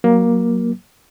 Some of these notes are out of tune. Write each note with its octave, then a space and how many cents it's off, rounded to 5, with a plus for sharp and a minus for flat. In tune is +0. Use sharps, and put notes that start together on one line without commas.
F#3 +0 A#3 +10